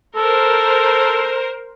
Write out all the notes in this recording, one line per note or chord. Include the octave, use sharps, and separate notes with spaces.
A4 A#4 C5